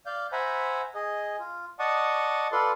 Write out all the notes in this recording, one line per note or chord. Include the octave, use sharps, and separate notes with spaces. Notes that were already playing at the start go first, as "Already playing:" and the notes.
D5 F5 G6
C5 E5 F#5 G#5 A#5 B5
G#4 D#5
F4
D5 D#5 F#5 A5 C#6 D#6
F4 A4 B4 D5 C6